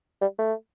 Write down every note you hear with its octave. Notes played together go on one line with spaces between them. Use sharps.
G3
A3